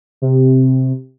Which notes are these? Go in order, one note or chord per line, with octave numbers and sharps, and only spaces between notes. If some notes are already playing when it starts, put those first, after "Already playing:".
C3